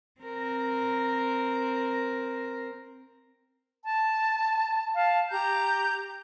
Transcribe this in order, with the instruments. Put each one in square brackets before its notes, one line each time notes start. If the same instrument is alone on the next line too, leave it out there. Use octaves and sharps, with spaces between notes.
[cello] C4 A#4
[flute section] A5
F5 A5
G4 A#5 G6